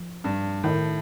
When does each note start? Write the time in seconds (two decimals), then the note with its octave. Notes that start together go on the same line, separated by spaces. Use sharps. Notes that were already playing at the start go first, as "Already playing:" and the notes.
Already playing: F3
0.24 G2
0.64 A2 D#3